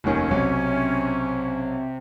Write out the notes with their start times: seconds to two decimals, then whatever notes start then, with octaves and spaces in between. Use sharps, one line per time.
0.04 F1 D#2 D#3 C#4
0.31 B1 C3 C4